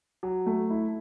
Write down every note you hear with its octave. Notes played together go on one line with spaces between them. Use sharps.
F#3
A3
E4